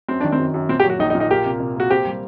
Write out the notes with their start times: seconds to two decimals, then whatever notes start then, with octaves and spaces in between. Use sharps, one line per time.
0.08 F#2 C4
0.20 D#3 D4
0.32 C4
0.39 F#2
0.54 F#2
0.69 A#2 C4
0.80 G4
0.84 F#3
0.90 F#4
0.99 A#1 D#4
1.10 D#4
1.15 A#2
1.20 D#4
1.30 A#3 G4
1.46 C3
1.60 C3
1.76 A#3 F#4
1.90 C4 G4
2.06 G3